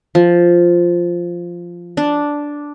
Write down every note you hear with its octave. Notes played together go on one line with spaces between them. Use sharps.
F3
D4